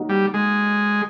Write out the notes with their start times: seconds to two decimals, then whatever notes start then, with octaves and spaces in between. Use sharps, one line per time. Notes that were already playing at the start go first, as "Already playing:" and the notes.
Already playing: F#3 A#3 D#4 F#4
0.09 G3
0.34 G#3